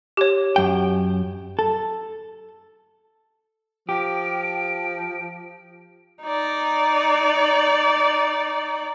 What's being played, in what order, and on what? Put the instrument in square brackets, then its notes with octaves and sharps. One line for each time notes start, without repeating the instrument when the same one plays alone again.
[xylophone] G4 C#5
[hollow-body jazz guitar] F#2 G5
A4
[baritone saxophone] F3 [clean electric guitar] G4 [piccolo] D7
[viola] D#4 D5